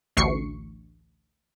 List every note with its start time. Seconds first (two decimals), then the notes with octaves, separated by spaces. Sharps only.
0.17 A1 D2 C#6 C7 C#7